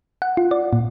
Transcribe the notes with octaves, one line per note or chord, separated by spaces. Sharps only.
F#5
F4
D5
A#2